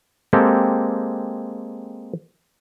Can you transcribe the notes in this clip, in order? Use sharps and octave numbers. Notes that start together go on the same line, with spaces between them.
G#3 A#3 C4 G4 A4